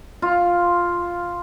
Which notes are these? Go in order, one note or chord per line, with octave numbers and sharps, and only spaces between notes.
F4